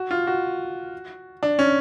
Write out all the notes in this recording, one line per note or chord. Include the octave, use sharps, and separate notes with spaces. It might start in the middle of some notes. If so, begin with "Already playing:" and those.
Already playing: F#4
F4
F#4
D4
C#4